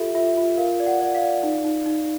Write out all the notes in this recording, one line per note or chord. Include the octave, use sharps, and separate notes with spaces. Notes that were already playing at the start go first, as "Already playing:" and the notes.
Already playing: F4 G4 A4 E5
F4 E5
F4
A#4 F5
D5
F#5
D5
F5
D5
D#4
D#4
D#4